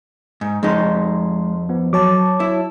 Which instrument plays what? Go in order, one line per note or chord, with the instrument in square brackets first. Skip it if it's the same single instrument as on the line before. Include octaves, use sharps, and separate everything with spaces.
[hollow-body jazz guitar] G#2
[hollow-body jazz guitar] F2 D#4 [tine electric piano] G#3 C6
[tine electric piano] F3 B3
[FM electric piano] F#3 C#5 A5 [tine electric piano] D6
[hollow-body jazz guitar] E4